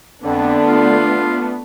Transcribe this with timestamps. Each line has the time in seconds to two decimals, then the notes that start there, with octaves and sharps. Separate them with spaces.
0.24 F2 D3 A3 B3 D4
0.68 F4